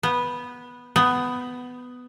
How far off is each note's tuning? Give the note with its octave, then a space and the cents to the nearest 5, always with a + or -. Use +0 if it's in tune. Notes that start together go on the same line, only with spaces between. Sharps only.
B3 -10
B3 +10